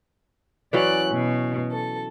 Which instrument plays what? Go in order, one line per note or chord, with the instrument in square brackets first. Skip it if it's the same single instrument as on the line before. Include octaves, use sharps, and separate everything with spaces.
[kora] E3 F#3 C#4 [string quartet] D5 F#6
[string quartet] B2
A4